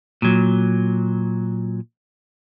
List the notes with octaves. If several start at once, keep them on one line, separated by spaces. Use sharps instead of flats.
A#2 F#3